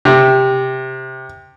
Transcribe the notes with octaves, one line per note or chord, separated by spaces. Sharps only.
C3